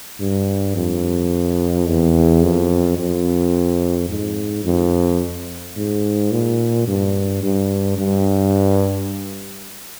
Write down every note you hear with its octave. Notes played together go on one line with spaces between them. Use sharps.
G2
F2
E2
F2
F2
G#2
F2
G#2
A#2
G2
G2
G2